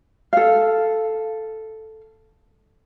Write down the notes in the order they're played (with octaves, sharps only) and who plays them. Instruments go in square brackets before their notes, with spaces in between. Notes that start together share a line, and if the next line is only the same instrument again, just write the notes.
[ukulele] A4 F5